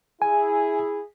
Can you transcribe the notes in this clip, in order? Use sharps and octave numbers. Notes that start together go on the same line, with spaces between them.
E4 G#4 G#5